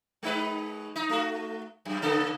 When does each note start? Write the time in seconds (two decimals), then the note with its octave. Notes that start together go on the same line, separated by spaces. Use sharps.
0.23 G#3 D#4 B4
0.96 D#4
1.09 A3 F#4
1.85 F#2
2.02 C#3 A#3 A4